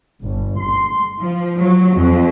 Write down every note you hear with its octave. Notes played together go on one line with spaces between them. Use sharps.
G1
C6
F3
F#3
F2